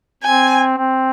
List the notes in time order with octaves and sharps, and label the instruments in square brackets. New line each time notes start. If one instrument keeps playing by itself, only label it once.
[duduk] C4 [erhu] G#5
[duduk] C4